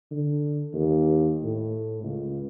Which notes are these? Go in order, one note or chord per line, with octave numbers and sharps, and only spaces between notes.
D3
D#2
A2
C#2